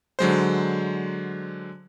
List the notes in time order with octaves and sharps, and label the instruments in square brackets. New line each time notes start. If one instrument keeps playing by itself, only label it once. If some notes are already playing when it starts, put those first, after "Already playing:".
[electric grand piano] D3 F#3 G#3 C5